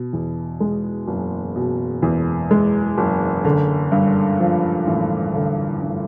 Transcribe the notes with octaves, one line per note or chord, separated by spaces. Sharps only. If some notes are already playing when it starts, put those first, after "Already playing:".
Already playing: B2
E2
G#3
F#1
B2
E2
G#3
F#1
D3
G2
F3
A1
D3
G2